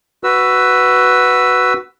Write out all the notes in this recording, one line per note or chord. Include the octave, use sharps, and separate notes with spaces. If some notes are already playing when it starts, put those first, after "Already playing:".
F#4 B4 E6